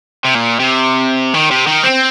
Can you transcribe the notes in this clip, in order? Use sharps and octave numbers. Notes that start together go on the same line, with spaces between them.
C3
A#2
C3
D#3
C3
D#3
C4